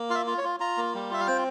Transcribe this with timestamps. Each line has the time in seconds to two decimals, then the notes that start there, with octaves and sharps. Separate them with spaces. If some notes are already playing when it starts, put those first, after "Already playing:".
Already playing: A#3
0.10 F4 F5
0.15 E5
0.27 F4
0.38 C#5
0.44 F4
0.60 F4 A#5
0.77 A#3
0.95 G3
1.10 F4 E5
1.20 F5
1.27 C4 G5